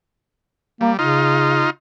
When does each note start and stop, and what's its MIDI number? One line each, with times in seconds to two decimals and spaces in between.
0.81 0.97 55
0.81 0.92 58
0.99 1.66 49
0.99 1.70 63
0.99 1.70 65